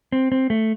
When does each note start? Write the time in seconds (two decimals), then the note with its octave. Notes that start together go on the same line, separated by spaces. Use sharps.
0.12 C4
0.32 C4
0.50 A3